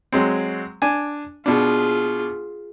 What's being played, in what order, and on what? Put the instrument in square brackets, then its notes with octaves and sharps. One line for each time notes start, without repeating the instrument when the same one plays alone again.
[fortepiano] F#3 G#3 C4
D4 G#5
[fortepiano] B2 D4 [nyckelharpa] F4 G#4